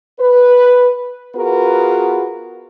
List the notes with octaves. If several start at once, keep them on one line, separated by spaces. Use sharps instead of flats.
B4
B3 F4 F#4 G#4 A#4 B4